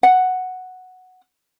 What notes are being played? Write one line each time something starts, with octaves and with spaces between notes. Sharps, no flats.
F#5